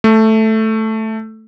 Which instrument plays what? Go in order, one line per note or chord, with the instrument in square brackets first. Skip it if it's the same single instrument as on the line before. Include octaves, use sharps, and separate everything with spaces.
[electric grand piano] A3